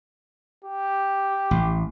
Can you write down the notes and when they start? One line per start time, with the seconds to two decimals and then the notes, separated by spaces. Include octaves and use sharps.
0.64 G4
1.51 A1